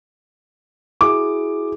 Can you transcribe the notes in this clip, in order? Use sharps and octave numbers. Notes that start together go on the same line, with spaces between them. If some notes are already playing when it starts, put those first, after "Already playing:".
E4 F#4 G#4 D6